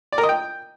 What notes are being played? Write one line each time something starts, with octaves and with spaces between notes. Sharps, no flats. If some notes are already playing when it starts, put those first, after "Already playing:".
D5
A#4
D#5
G5